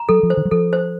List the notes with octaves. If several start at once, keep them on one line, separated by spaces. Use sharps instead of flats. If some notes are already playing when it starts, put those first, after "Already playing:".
Already playing: A#5
F#3 A4
F3
C5
D#3
F#3
F3 A4
C5